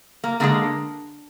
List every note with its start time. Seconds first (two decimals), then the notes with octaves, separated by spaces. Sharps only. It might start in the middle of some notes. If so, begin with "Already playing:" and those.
0.24 A#3
0.40 D3 F3 G#3 A#3